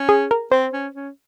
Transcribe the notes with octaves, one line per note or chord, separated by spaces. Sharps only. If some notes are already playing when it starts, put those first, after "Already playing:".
Already playing: C#4
G#4
A#4
C4 C5
C#4
C#4